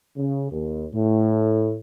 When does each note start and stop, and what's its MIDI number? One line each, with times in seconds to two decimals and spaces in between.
0.16 0.50 49
0.50 0.86 39
0.94 1.77 45